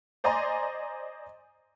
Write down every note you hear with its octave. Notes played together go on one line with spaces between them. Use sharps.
C5 D5 D#5 G#5 A#5 C6